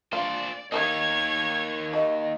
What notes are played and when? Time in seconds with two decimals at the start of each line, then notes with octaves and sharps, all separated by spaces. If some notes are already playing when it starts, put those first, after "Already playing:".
0.13 D4 F4 C5 D5
0.72 D#3 E3 A#3 D#4 C#5 D#5 G#6
1.93 F#4 D#5